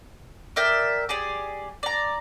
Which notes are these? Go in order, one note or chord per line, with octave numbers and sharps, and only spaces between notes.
A#4 D5 E5 G5
G4 G#4 D5
D5 A#5